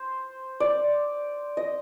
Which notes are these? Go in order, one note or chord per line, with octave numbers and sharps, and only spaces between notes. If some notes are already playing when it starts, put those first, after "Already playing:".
Already playing: C5
D5
D#5